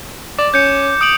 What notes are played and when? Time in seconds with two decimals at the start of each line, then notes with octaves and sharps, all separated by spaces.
0.39 D5 D6
0.54 C#4 G6 C#7
1.01 D#6 D7 F#7